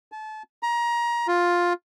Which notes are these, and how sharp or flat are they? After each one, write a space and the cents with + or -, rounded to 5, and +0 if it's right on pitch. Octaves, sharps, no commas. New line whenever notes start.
A5 -30
A#5 +25
F4 +10